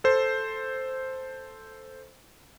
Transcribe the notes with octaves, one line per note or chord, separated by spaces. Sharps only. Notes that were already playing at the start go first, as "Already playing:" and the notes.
A4 C5